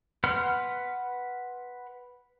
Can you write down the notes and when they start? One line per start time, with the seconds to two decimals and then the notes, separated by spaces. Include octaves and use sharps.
0.24 B4 F#5 C6 F6